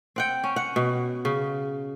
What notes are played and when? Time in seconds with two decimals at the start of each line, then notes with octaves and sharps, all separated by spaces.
0.16 C4 F#5 G5
0.44 C#4
0.56 F#5
0.76 B2
1.25 C#3